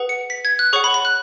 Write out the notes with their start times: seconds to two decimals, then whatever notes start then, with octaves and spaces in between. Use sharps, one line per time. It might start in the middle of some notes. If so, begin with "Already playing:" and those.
Already playing: G#4 B4 F#5
0.09 C#7
0.30 B6
0.45 G#6
0.59 F#6
0.73 G#4 C#5 F#5 C#6
0.84 B5
0.94 B5
1.05 F#6